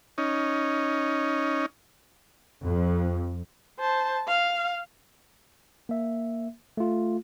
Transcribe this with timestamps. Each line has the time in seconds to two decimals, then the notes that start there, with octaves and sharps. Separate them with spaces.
0.18 C#4 D#4
2.64 F2
3.80 C5 A5
4.27 F5
5.89 A#3 E5
6.77 A3 F4